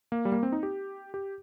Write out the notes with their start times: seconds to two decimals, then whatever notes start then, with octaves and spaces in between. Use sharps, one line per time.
0.12 A#3
0.25 G3
0.32 A#3
0.43 C4
0.52 D#4
0.63 G4
1.14 G4